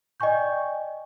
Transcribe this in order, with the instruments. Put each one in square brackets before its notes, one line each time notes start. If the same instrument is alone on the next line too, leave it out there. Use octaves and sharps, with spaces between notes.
[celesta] D5 D#5 G5 G#5 C#6 G6